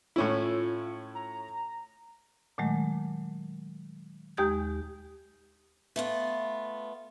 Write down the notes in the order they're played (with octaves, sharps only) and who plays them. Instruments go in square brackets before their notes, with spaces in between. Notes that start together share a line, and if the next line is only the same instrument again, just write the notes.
[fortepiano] A2 C#4 E4 [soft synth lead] F4
[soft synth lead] A#5
[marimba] A#2 D#3 F#3 G#3 A3
D#2 G#3 G4 D#6 G6 G#6
[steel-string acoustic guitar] A3 B3 F4